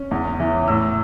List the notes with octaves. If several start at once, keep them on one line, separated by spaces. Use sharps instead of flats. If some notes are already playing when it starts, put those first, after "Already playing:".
Already playing: C#4
E2
E3
A2 E6